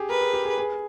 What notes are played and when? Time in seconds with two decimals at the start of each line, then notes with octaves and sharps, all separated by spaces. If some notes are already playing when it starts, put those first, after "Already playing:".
Already playing: G4 G#4
0.09 A#4 B4
0.21 G#4
0.34 G4
0.45 G#4
0.58 G#4